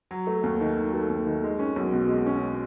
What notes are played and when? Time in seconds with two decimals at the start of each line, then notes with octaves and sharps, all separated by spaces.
0.11 F#3
0.27 A3
0.43 D#2
0.61 D#3
0.76 F#3
0.94 A3
1.09 D#2
1.27 D#3
1.44 G#3
1.59 C#4
1.76 B1
1.93 B2
2.09 G#3
2.26 C#4